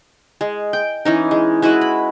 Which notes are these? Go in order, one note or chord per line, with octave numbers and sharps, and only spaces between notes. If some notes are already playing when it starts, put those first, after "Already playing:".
G#3
G5
E3 C#4 D#4
G#3
G#3 E4 F#4 B4
B5